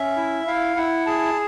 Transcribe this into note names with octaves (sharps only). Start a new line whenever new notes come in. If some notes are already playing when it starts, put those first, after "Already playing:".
Already playing: C#4 E5
E4
E4 F5
E4 F#5
G#4 A5